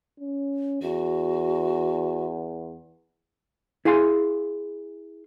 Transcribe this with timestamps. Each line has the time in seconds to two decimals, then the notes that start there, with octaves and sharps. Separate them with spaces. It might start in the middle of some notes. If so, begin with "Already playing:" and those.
0.20 C#4
0.82 E2 F#4
3.85 E4 G#4 F5 G#5 C6